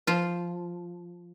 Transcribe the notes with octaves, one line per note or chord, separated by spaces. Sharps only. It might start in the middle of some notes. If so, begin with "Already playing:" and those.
F3 F4